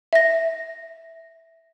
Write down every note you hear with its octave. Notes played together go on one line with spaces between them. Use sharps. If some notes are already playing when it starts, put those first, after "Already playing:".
E5 A#6